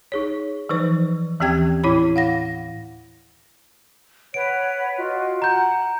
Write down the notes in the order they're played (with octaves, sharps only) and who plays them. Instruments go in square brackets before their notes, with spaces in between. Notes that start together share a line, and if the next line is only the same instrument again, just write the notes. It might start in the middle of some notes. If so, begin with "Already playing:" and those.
[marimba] D#4 G#4 C#5
E3 F3 D#4 B4 C5
D#2 E3 C4 G4 G5 G#6
A2 E4 C#5 B5
F5 F#5 A#6
[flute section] B4 C#5 F#5 [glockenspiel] D7
[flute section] F4 F#4 D#5
[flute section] F#5 [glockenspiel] A#5 G6